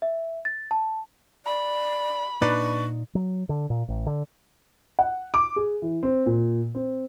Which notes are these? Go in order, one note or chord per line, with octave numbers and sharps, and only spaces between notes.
E5
A6
A5
D5 B5
A#2 D4 D#4 B4 D5 A#5 C#6
F#3
D3
A#2
A1
D3
F#5
D6
G#4
E3
C4
A#2
C4